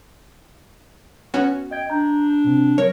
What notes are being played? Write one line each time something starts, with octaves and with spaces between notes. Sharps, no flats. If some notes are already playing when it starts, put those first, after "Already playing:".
B3 C#4 F#4
D#5 G5 G#6
D4 A#5 G6
C3 C4
F#3 A#4 C#5